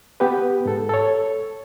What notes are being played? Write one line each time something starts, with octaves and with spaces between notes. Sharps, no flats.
B3 G4 B4
G#2 A4
A4 C#5